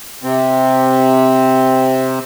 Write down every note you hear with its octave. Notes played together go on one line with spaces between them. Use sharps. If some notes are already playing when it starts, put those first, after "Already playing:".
C3 C4